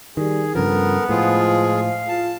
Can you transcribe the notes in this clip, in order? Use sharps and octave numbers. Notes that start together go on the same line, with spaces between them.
D#3 G3 G#4
G2 C#3 F3 B3 A4 A#4
A2 F3 G#3 F4 G#4
F5
F4 A5